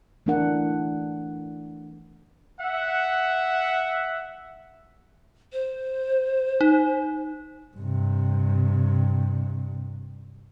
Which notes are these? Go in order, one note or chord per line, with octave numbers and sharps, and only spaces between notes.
E3 A3 B3 D4 A#4 F#5
E5 F#5
C5
D#4
G2 C3